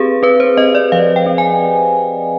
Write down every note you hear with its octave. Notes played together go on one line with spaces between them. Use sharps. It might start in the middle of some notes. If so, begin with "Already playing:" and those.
Already playing: C4 G4 G#4 B4
C4 B4
C5
C4 D#5
D5
F3 F5
G5
C4
G#5